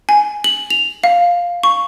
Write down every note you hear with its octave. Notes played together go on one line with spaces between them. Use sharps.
G#5
F#7
F7
F5
C#6